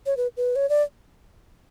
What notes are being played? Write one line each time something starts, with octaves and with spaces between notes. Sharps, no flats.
C#5
B4
B4
C#5
D5